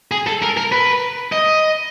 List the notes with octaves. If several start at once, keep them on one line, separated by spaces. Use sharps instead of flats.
G#4
A4
A#4
A#4
B4
D#5